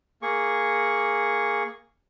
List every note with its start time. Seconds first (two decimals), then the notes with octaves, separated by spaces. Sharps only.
0.22 A#3 G#4 C#6